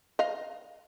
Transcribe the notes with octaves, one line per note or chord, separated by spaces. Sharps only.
D#5 F5